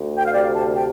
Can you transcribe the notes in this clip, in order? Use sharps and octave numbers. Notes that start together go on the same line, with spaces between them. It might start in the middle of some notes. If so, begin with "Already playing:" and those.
Already playing: D2
G5
F5
C3 D5
A5
C3 G5